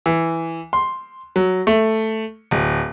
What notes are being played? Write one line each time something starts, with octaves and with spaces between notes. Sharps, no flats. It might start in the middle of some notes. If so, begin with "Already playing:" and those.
E3
C6
F#3
A3
D1